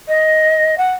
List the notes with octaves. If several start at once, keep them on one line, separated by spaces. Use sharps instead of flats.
D#5
F#5